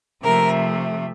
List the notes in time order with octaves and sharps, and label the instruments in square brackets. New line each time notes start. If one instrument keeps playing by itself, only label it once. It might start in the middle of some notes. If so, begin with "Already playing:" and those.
[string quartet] C3 F3 A3 A#4